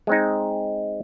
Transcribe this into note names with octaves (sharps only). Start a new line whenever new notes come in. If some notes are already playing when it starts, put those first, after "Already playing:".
G#3 C4 D#4